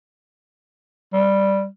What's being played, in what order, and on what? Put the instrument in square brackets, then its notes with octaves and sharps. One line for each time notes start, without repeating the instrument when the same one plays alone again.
[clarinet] G3